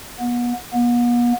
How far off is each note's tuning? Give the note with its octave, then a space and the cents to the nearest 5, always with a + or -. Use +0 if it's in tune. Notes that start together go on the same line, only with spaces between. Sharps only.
B3 -35
B3 -45